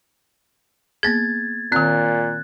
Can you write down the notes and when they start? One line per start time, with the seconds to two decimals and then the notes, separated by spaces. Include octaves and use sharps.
1.03 A#3 B3 G#4 G#6 A6
1.72 A#2 D#3 C4 F#6